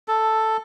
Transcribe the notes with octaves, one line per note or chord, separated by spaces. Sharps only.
A4